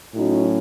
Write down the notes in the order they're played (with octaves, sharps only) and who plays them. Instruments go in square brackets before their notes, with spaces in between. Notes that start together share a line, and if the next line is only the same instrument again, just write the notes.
[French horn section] A2 F#3 C#4 D#4 F#4